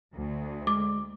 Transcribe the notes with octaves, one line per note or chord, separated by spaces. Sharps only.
D2
G#3 D6